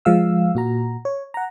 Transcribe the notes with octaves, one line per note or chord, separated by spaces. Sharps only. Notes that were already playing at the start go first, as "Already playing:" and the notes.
F3 G#3 F5 E6
A#2 F#4 A#5
C#5
F#5 A#5